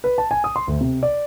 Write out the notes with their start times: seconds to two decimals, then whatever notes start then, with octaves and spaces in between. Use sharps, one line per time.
0.04 B4
0.18 A5
0.31 G#5
0.44 D#6
0.56 C6
0.68 D2
0.81 C3
1.03 D5